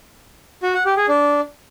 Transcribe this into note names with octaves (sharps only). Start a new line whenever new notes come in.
F#4
F#5
G4
G#4
D4